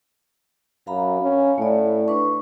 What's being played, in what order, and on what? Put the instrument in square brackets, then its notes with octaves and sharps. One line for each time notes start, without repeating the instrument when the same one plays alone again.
[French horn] F#2 [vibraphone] F5 A#5 B5
[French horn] C#4
[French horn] A2 [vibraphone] A3 D5
[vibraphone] D4 B4 C#6